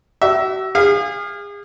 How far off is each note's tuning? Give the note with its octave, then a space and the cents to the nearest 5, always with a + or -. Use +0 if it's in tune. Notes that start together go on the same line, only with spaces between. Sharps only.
F#4 +40 E5 +0
G#4 -35 F5 +0